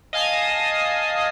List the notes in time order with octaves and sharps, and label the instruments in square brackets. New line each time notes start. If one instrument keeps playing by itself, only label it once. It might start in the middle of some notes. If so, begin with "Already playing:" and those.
[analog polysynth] D#5 F5 G#5 A5 D#6